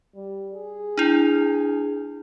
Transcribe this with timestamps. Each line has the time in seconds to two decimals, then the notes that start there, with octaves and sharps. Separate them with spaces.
0.15 G3
0.55 G#4
0.98 D4 E4